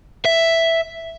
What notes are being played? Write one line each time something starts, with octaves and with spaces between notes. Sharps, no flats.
E5